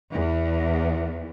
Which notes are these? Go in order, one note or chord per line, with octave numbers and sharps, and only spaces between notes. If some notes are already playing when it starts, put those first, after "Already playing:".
E2